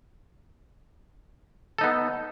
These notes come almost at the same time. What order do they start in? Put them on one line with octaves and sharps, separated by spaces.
A4 D#4 B3